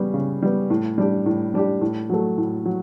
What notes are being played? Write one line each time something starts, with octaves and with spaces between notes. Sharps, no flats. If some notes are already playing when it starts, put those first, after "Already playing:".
Already playing: C#3 G3 B3
C#3
G3 B3
A2
G3 D4 G4
A2
G3 D4 G4
A2
F#3 A3
A2
F#3